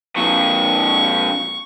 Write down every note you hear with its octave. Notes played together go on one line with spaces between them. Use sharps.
F2 A#2 C#6